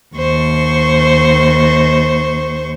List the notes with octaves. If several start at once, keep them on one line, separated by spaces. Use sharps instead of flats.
D#2 C5 C#6